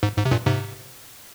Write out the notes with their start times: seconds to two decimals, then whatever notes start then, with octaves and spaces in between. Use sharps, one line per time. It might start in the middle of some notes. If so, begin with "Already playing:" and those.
0.03 G#2
0.18 G#2
0.25 C3
0.31 G2 A#2
0.46 G#2 C3